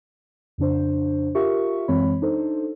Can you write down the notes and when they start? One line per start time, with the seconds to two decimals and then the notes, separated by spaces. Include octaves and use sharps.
0.58 F2 C#3 D4 C5
1.35 F4 G4 A#4 E5 C#6
1.88 F#2 E3 G#3 C4 C#5 B5
2.22 D4 D#4 A4 C5